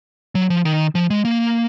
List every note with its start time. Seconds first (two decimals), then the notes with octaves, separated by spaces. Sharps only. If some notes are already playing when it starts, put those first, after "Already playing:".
0.35 F#3
0.50 F3
0.65 D#3
0.95 F3
1.10 G#3
1.25 A#3